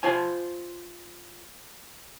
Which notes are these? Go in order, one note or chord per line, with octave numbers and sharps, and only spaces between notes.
F4 C5 G#5